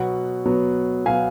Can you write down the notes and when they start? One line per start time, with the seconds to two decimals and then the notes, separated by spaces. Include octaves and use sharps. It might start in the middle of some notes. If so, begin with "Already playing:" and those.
Already playing: B2 F#3 B3 F#5
0.46 B2 F#3 B3
1.06 B2 F#3 B3 F5 G#5